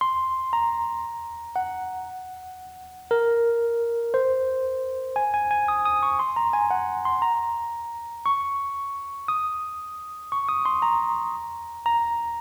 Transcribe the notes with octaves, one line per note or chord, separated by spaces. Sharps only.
C6
A#5
F#5
A#4
C5
G#5
G#5
G#5
D#6
D#6
C#6
C6
A#5
G#5
F#5
C6
A#5
C#6
D#6
C#6
D#6
C6
A#5
A#5